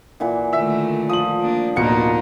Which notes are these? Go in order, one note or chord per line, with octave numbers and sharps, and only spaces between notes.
A#2 E3 F#5
D3 D#3 A3 E5 E6
F3 D#6 F#7
A#3 D4
D1 B2 F3 A#3 D4 D#4 A#4 C#7